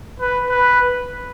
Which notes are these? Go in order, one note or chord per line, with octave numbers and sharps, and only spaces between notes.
B4
B4